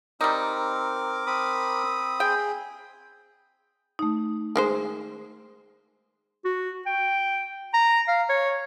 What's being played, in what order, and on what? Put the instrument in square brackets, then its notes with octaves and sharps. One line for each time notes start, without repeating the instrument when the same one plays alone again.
[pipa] G3 D#4 [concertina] C4 [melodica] A#4 D6
[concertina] C4 B5 D#6
[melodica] G#4 [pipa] G5
[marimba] A3 D#4
[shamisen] D#3 G#3 C5
[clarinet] F#4
G5
A#5
F5
C#5